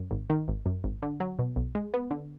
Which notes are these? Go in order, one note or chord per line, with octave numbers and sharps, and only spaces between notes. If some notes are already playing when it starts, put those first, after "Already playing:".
Already playing: F#2
G#1
D#3
G#1
F#2
G#1
D3
F#3
B2
B1
G#3
B3
D3